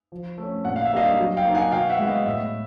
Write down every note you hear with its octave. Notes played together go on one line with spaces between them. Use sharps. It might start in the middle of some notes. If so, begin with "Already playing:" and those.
F3
A3 C#4
A#2 F#5
F5
E5
G3 A#3 D4 D#5 F5
F#3
F5 G5
A#3 D#4
F#5 G#5
B2 F5 G5
E5 F#5
G#3
B3 D#5 F5
A2 E5